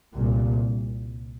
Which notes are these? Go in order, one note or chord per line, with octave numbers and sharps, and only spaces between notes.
C2 A#2